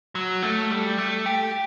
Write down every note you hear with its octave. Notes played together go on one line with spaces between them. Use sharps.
F#3
A3
G3
A3
G4